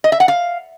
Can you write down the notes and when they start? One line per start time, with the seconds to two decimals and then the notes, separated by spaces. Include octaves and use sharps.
0.04 D#5
0.12 E5
0.20 F#5
0.28 F5